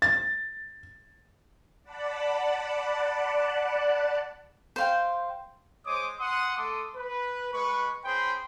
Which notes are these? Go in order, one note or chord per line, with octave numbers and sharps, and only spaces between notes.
A6
D5 F#5 A5 B5
C5 F5 G5
G#3 C5 C#5 D6 D#6
F#5 C6 D#6
A3 A4 C6 D6 D#6
B4
G#3 B4 C#6
C#4 G#4 C5 G5 B5 C6